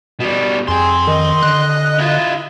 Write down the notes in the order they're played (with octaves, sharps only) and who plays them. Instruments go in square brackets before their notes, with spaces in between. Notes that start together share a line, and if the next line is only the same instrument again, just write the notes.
[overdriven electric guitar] B2 G3
[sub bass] F2 [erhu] G#4 [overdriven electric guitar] G5 C6
[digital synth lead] D#3 [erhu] D#5
[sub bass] D3 [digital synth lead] F#6
[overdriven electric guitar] E4 F4